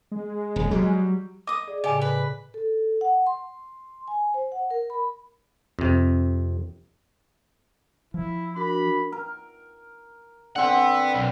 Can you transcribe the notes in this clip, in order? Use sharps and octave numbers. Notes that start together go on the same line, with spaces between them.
G#3
D#1
F#3 G3
D#5 D6 D#6
G#4 D5
A2 C#3 G4 D#5 G#5 A5
B4
A4
F#5
C6
G#5
C5
F#5
A#4
B5
F2 C3
F3 E4
D4 F#4 A#4 B5
A#4
D3 C4 B4 F#5
B1